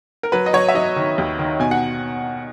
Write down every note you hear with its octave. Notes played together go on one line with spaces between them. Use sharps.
A#4
F#3 B4
D#5
F#3 C#5
E5
F#3 D#5
D#3
D#2
D#3
B2 G#5
F#5